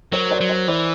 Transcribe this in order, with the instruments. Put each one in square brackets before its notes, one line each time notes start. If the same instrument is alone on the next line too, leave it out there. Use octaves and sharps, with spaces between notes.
[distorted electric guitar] F#3 [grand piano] A#4 C5
[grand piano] C5 D5
[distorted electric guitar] F#3
[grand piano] C5 D5
[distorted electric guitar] E3 [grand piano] C5 D5